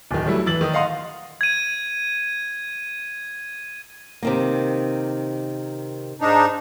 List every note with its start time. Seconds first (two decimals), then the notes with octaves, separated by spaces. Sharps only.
0.11 D1 D#3
0.26 F#3 G3 A3 E4
0.46 E3 E6 A6 F#7
0.61 D#3 D#6
0.73 D#5 F5 F#5 C6 D#6
1.41 G#6 D#7
4.23 C3 D#3 A#3
6.21 G#2 D4 D#4